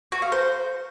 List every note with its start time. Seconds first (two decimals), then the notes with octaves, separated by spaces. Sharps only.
0.12 F#4
0.22 F5
0.32 C5